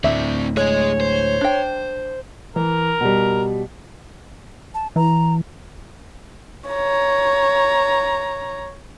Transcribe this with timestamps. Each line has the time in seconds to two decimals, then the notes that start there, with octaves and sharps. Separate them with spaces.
0.04 D2 A2 C4 D5 E5
0.57 G#3 G#4 C#5 D#5
1.00 C5
1.41 D4 G5
2.56 E3 A#4
3.01 B2 G3
4.74 A5
4.96 E3 A#5
6.69 C#5 A#5